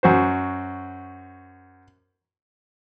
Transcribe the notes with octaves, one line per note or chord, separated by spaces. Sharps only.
F#2 F#4 C5